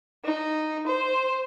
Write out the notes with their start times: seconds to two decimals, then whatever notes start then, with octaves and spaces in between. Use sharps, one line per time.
0.25 D#4
0.87 C5